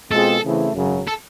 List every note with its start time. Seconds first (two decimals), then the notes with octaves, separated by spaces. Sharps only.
0.11 B2 G#3 C4 F4 G#4 A4
0.43 C#3 E3 A3 C4 E4
0.75 G#1 F#2 C#3 F#3
1.07 A4